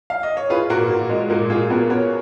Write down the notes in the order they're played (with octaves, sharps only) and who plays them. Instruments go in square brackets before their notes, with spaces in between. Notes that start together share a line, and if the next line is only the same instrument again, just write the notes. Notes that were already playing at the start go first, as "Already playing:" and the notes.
[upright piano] F5
D#5
C#5
[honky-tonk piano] F4 [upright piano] G#4 B4
[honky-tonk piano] A#2 [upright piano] F#4 A#4
[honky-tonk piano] A#2
G#3
[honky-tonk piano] A#2 [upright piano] F#4 A#4
[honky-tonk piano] A#2 [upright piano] F4 G#4
[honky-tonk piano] B3 [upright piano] F#4 A#4
[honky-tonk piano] B3 [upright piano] A#4 C#5